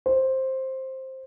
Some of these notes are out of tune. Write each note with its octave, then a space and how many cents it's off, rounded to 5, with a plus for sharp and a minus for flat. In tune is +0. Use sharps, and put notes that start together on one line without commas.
C5 +10